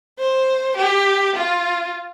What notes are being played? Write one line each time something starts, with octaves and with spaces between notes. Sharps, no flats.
C5
G4
F4